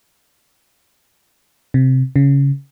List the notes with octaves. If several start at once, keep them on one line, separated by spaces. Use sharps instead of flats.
C3
C#3